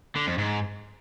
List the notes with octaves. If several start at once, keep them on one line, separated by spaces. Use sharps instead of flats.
D3
F2
G#2